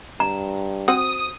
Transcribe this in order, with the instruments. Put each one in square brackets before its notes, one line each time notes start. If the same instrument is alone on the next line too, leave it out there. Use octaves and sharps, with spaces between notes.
[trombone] G2 [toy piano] A#5
[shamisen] C4 F#4 C5 [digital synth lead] D#6